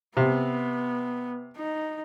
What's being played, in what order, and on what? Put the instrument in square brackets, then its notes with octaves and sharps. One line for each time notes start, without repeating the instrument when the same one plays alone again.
[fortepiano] C3 [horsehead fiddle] B3
[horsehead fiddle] D#4